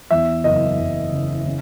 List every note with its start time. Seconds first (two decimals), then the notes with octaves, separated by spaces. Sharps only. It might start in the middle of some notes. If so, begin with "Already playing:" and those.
0.11 E2 E5
0.44 F#1 D#5
0.79 F#1
1.12 C#3
1.46 C#3